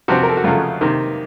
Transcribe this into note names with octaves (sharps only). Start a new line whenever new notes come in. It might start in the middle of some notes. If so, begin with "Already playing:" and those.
C3 F3 C4 F#4
A#4
A4
F#4
F2 C#3 F#3 A3 F4
C3 D#3 A#3